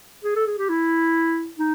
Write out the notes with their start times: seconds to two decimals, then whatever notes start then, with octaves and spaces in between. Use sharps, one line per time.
0.24 G#4
0.36 A4
0.47 G#4
0.58 G4
0.69 E4
1.59 D#4